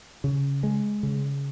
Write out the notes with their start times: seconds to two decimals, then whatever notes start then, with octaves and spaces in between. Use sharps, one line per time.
0.24 C#3
0.63 G#3
1.03 C#3